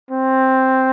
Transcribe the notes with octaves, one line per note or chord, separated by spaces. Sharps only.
C4